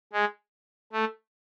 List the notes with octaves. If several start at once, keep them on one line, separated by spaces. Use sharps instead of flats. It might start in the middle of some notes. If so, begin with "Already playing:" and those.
G#3
A3